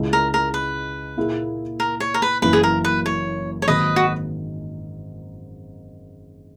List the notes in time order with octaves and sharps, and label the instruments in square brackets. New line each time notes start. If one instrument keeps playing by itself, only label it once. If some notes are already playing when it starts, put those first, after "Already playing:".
Already playing: [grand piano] C#2 C#3 G#3 C#4 E4
[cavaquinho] A#4
A#4
B4
[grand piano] A#2 A#3 E4 G#4
[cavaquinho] A#4
C#5
A#4
B4
[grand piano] F#1 F#2 E3 A#3 E4 [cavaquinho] B4
[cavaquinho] G#4
A#4
B4
C#5
C#5
[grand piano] G#1 G#2 D#3 F#3 A#3 [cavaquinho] B4 D#5
[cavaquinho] F#4